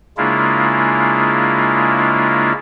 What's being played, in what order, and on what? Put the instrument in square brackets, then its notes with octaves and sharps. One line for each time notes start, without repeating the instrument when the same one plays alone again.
[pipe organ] C#3 G#3 A#3 D4 E4 F4